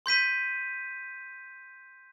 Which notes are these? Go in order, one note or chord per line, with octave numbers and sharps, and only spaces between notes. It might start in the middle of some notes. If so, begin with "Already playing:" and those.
C6 G6 B6 D#7